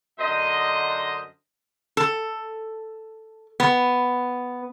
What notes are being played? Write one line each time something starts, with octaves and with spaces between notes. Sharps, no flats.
F#2 D3 C5 D#5
A4
B3